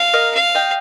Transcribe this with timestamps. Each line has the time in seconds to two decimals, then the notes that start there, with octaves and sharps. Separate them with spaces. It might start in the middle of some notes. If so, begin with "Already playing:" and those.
Already playing: F5
0.13 A#4 D#5
0.34 F5
0.55 D#5 G5